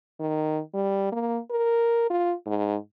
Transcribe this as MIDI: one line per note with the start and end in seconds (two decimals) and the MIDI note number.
0.19 0.60 51
0.74 1.08 55
1.12 1.39 58
1.51 2.08 70
2.10 2.34 65
2.46 2.76 44